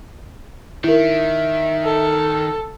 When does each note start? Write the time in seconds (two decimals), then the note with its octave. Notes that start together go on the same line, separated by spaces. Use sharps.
0.84 D#3 E4 A#4 E5
1.85 A4